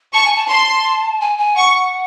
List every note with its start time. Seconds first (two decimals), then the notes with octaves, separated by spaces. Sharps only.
0.14 A5 C#6
0.25 G#5
0.36 A5
0.49 A5 C6
1.21 G#5
1.38 G#5
1.56 F#5 C#6